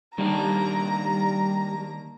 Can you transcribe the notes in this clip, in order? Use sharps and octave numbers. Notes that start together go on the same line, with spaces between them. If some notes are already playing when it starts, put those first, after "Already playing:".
D#3 G3 A#3 D4 A#5